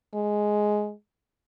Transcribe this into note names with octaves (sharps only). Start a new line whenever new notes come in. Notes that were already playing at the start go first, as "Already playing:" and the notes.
G#3